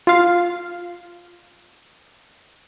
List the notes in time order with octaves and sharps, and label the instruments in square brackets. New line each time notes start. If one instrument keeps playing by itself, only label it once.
[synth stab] F4 F5